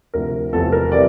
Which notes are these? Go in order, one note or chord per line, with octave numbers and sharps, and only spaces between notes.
D2 C3 F3 A3 A#4
E1 E2 C3 F3 A4
A#4
C3 E3 G3 D5